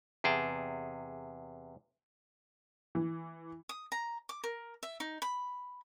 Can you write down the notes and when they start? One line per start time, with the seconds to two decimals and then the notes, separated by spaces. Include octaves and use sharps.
0.24 E2 C3 G#4 G5 A5
2.95 E3
3.69 D#6
3.92 A#5
4.29 D6
4.44 A#4
4.83 E5
5.00 D#4
5.22 B5